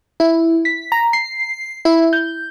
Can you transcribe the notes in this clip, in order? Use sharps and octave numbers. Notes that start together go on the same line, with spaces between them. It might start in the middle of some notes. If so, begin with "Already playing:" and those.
E4
B6
A#5
C7
E4
G6